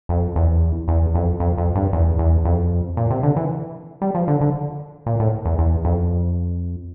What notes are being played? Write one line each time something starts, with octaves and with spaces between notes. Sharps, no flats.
F2
E2
E2
F2
F2
F2
G2
E2
E2
F2
A#2
C3
D3
E3
G3
F3
D3
D3
A#2
A2
E2
E2
F2